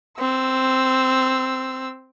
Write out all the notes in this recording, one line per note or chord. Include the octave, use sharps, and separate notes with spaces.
C4 E6